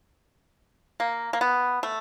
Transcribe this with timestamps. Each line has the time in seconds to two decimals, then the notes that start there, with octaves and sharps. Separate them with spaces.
1.00 A#3
1.33 A#3
1.41 B3
1.83 A3